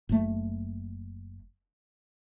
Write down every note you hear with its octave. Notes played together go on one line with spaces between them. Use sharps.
F#1 A3